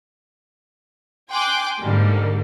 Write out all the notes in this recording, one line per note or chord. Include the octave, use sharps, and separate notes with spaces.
G5 G#5 C6 D6 F#6 G6
G#2 D3 G3 G#3 A#3